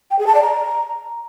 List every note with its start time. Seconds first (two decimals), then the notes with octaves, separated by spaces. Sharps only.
0.11 G5
0.19 G#4
0.27 A5
0.35 D5
0.43 A#5